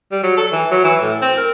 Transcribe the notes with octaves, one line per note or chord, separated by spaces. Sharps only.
G3
F#3
A4
E3
F#3
E3
A2
C4
A#4